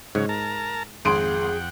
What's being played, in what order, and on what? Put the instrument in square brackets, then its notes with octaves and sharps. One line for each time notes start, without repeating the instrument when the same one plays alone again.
[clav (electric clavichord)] G#2 [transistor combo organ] C#3 F#3 C#5
[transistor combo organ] A#4 A5 A#5
[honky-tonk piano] G#1 C6 D7 [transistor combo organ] F2 F#5 G5 [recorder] G#4